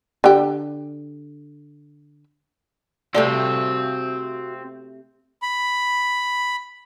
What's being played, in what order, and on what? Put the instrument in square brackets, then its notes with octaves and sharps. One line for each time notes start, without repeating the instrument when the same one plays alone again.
[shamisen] D3 G4
[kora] C3 A3 G5 [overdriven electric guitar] C4 [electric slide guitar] F#4 C5 F5 [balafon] D5
[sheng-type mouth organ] B5